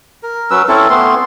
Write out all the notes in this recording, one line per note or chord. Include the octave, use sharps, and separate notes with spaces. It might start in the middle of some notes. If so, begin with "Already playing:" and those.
A#4
F#3 C#4 B4 E6
C4 C#4 E4 A4
A3 B3 C4 C6